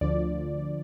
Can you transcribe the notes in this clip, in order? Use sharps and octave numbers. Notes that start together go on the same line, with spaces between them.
D2 D3 F3 D5